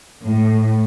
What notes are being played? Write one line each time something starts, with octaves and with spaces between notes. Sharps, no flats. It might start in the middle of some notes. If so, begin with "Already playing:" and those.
A2